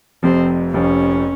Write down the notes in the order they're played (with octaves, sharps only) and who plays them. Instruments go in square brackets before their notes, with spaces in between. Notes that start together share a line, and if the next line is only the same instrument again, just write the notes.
[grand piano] F1 F2 C3 F3 [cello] C4
[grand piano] F1 F2 C3 F3 [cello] C#4